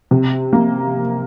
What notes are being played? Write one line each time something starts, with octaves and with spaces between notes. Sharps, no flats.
C3
A#3